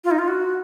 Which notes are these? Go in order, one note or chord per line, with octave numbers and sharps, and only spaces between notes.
F4
D#4
F4
F#4